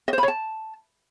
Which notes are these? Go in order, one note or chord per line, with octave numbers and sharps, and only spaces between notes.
D#5
C5
B5
C#5
A5